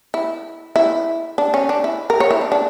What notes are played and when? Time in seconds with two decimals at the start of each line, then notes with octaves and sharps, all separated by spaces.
0.14 E4
0.76 E4
1.38 D4
1.54 C#4
1.69 D4
1.84 E4
2.10 A#4
2.20 C#5
2.31 E4
2.41 D4
2.52 D4